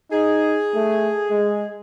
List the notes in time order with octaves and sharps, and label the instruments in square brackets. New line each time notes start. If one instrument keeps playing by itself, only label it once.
[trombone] D#4 [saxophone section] G#4
[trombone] A3
G#3